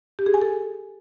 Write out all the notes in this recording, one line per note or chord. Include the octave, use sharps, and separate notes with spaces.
G4
G#4
G#5
A4